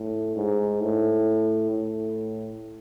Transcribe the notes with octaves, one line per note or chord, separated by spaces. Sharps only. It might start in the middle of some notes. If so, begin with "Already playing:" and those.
Already playing: A2
G#2
A2
A2